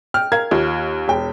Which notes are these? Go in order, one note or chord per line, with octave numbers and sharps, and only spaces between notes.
G5 F6
A#4 F5 G#6
D#2 F4
E1 G5